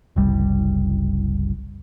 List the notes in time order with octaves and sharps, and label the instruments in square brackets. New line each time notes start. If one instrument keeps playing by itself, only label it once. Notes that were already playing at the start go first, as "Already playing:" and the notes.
[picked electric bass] F#1 C2 G3